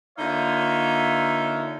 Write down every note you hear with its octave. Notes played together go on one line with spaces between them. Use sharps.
D3 A#3 D#4 F4 C#5 E5